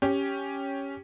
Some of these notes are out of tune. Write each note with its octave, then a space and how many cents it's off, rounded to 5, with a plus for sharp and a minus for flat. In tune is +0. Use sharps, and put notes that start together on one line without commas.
C#4 +0 G4 +0